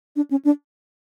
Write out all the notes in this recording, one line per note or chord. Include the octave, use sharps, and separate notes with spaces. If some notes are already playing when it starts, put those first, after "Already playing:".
D4
C#4
D4